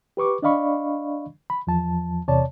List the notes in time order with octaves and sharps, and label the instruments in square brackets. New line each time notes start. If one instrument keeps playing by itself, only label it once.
[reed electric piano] G4 B4 C#6 D6
D4 D5 D#5 F5 B5 C#6
B5
E2 F3 A5
E2 C3 C#5 D5 A5